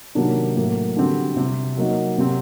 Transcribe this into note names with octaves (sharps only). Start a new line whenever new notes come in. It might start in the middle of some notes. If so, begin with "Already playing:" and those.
C3 D#3 F#3 A#3 D4
A2 F#3 A#3
D3 G3 C4 F#4
C3 G3 C4
F#3 A#3 D#4 F#4
C3 F#3 C4 F#4